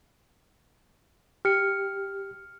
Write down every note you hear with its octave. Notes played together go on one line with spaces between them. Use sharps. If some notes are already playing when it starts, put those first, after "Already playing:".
G4 F6 C#7